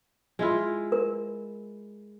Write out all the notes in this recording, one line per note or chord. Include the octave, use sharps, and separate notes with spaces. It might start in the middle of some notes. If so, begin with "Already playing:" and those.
G#3 E4 F4
A#4